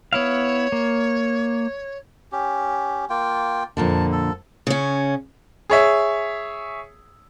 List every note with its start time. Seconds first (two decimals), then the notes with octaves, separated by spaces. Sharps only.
0.13 B3 E4 C#5 F5
0.72 A#3
2.32 C#4 G4
3.10 A#3 F4 G5
3.77 F2 A#2 D3 A5
4.12 A4
4.67 C#3 C#4
5.70 G#4 C#5 E5